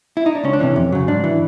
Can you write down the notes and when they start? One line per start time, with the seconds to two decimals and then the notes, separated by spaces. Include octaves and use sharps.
0.17 E4
0.26 D#4
0.35 D4
0.43 C#2 C#4
0.53 D4
0.60 C3 E3 C#4
0.76 F2
0.92 C#3 F#3
1.07 G#2 D4
1.24 E3